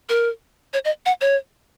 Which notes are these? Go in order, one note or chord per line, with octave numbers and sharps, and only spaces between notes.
A#4
C#5
D#5
F#5
C#5